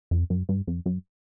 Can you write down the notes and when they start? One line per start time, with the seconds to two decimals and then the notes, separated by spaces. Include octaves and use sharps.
0.11 F2
0.30 F#2
0.49 G2
0.67 F2
0.86 F#2